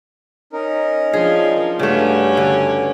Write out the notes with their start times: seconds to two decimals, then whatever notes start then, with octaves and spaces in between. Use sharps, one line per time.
0.53 C#4 D#4 A#4
1.13 F3 D4 G#4
1.79 G2 C#3 A3 C#4 F#4 D6 F#6
2.37 D3